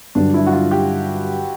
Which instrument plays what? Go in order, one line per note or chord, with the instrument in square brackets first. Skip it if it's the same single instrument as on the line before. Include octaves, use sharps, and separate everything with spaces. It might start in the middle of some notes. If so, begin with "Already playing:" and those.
[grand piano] G2 D3 F#3 [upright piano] D4
[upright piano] E4
F#4
F4
G4